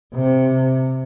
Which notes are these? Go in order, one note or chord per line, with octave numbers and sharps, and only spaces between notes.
C3